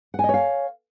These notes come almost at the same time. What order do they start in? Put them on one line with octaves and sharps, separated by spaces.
F#5 G#5 D#5 C#5 F5